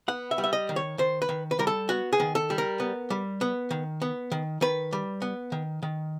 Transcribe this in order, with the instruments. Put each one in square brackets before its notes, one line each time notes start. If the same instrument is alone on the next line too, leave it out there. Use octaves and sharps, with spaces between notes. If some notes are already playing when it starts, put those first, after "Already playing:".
[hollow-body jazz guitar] B3 F#5
E5
G3
E5
D#5
D#3
C#5
D#3 C5
B4
D#3
B4
G3 A#4
A4
B3 F#4
G#4
D#3
A4
G3
A#4
B3
G3
B3
D#3
B3
D#3
D#3 B4
G3
B3
D#3
D#3